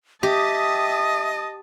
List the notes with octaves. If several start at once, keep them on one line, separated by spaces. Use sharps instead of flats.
G4 D#5 E5 A5 D#6